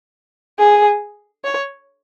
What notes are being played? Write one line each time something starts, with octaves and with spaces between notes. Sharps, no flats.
G#4
C#5